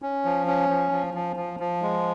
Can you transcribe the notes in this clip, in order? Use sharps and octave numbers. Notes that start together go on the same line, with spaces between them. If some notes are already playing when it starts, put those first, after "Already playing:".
C#4
F3
C#4
F3
F3
F3
F3
F3
G#3